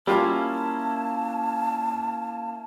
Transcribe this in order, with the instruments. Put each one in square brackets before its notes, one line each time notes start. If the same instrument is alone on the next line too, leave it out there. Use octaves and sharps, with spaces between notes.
[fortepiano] G3 F4 [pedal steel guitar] A#3 C#4 E4 [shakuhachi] A5